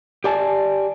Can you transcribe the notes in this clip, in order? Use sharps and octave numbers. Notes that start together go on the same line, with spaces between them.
G4 D5 G#5 A5